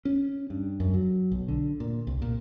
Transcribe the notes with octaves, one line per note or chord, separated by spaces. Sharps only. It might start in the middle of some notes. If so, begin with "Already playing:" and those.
C#4
G2
F#2
F#3
B1
D3
A#2
C2
A#2